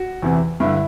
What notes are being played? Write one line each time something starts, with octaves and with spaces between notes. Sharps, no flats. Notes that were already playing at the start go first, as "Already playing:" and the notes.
Already playing: F#4
E2 C3 E3
G2 D3 E4